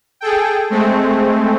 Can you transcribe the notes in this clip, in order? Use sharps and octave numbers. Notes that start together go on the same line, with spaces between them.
G#4 A4 G5
G#3 A3 C4